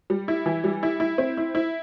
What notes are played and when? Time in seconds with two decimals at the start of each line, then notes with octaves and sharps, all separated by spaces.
0.10 G3
0.28 E4
0.46 E3
0.64 G3
0.83 E4
1.00 E4
1.18 C4
1.37 E4
1.55 E4